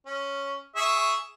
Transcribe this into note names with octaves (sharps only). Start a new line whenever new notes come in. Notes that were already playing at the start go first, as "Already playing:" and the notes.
C#4
G#4 E5 C#6